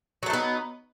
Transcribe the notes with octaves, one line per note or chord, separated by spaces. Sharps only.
F#3 A3 B3 D#4